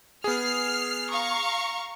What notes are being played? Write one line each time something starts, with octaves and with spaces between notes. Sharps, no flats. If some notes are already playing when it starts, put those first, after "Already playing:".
B3 G#4 F6 C7
F5 A#5 C#6